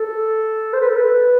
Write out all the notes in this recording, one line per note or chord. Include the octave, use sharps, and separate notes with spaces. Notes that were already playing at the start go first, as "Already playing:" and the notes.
Already playing: A4
C5
B4
A4
B4